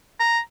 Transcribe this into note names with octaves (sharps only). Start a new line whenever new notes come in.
A#5